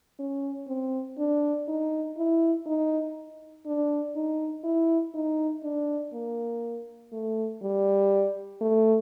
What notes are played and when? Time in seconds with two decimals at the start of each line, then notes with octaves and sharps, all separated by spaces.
0.19 C#4
0.68 C4
1.18 D4
1.68 D#4
2.17 E4
2.66 D#4
3.66 D4
4.15 D#4
4.64 E4
5.14 D#4
5.63 D4
6.13 A#3
7.12 A3
7.62 G3
8.61 A3